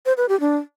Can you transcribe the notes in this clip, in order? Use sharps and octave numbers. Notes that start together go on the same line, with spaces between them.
C5
B4
G4
D4